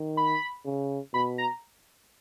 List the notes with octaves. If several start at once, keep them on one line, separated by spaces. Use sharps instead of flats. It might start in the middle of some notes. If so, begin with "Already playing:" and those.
Already playing: D#3
B5
C#3
B2 B5
A#5